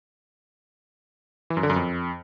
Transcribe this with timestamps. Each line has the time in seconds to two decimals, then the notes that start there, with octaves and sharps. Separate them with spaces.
1.50 E3
1.57 F#2
1.63 D3
1.70 F#2
1.76 F2